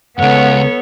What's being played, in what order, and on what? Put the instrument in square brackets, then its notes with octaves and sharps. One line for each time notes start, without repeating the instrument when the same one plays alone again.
[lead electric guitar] C#2 F#2 [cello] B3 [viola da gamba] A4 C#5 [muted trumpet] F#5